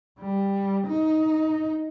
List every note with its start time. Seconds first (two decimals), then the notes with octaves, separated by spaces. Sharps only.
0.19 G3
0.87 D#4